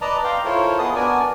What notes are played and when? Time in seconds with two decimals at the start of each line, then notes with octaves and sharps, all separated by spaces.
0.01 B4 D5 D#5 A5 A#5
0.24 F5 G5 A#5 C6 D6
0.45 E4 F4 A4 A#4 C5 C#5
0.78 B3 G#4 B4 D#5 A5 D#6
0.95 B3 D4 F#4 A#4 D5 G#5